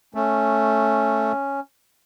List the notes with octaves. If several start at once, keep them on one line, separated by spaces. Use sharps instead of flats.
A3 C#4